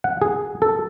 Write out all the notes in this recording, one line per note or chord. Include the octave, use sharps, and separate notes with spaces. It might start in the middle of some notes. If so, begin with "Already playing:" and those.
F#5
G#4
A4